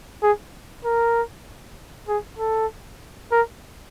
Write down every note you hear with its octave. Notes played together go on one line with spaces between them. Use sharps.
G#4
A#4
G#4
A4
A#4